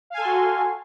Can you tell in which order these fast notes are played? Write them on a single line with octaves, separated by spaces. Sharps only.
F5 G#5 A4 C6 F#4